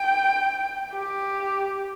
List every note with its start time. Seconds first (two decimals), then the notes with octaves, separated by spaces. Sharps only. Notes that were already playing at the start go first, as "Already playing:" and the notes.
Already playing: G5
0.93 G4